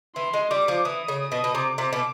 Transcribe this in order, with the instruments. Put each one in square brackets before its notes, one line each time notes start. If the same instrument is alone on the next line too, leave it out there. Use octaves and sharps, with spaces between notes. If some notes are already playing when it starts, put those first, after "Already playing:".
[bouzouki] E3 [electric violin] C6
[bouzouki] G#3
[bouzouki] G3 [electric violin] D6
[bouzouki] F3
[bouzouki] E3 [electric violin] D#6
[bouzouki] C#3
[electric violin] D#6
[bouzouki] B2
B2
[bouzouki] C3 [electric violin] D6
[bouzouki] C3
B2